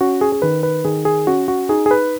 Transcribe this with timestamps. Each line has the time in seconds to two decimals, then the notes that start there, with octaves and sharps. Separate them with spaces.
0.01 C#4 F#4
0.21 G#4
0.32 G#4
0.42 D#3 B4
0.63 B4
0.85 D#3 G#4
1.05 G#4
1.27 C#4 F#4
1.48 F#4
1.69 D#4 G#4
1.86 G#4
1.91 B4